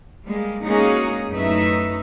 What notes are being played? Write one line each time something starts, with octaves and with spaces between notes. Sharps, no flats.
G3 G#3 A#3
G#3 A#3 C#4 D#4 F#4 G#4
F#2 A2 A3 D#4 B4 E5